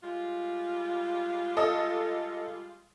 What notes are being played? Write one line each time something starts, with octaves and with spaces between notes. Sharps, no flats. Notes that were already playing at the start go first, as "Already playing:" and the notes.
G3 G#3 F4
A4 D#5